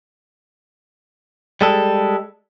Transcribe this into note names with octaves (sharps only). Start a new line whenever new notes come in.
G3 G#3 A4